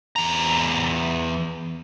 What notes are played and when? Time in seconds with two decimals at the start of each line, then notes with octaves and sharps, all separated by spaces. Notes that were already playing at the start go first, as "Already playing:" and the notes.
0.16 E2 A#5